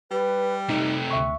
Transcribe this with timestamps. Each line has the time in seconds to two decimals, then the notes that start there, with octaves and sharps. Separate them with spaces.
0.11 G3 B4
0.70 C3 A3 D#4 G5 F#6
1.11 D2 E5 C#6